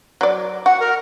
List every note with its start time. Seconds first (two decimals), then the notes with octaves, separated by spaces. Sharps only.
0.21 F#3 D5
0.66 F#4 F#5
0.80 A#4